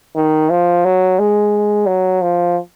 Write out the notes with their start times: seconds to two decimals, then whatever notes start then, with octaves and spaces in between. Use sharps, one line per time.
0.16 D#3
0.50 F3
0.84 F#3
1.19 G#3
1.86 F#3
2.21 F3